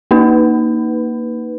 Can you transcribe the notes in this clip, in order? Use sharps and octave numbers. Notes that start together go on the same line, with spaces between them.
A#3 D#4 B4